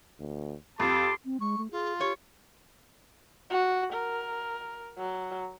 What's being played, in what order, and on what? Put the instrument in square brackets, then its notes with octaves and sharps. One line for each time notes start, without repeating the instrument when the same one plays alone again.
[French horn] D2
[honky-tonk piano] F2 [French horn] G4 [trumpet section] A5 C6 D6
[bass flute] C4
[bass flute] G#3 [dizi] C#6
[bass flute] A3
[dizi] F4 [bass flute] G#4
[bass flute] G4 [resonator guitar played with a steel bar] C#5
[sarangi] F#4
A#4
F#3